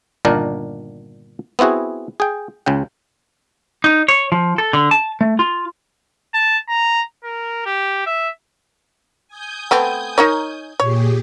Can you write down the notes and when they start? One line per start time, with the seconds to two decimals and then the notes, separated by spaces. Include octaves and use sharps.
0.25 G1 A#2 D#3 D4 A#4
1.59 B3 C4 E4 F#4 G#4
2.20 G#4 G5
2.66 C#2 C#3 G5
3.84 D#4
4.08 C#5
4.32 F3
4.58 A4
4.73 D3
4.91 A5
5.21 A3
5.39 F4
6.34 A5
6.69 A#5
7.24 A#4
7.66 G4
8.07 E5
9.28 G#5 D#6 G6
9.71 A3 B3 C4
10.18 D#4 A#4 C#5
10.80 A#2 G4 G#4 C#5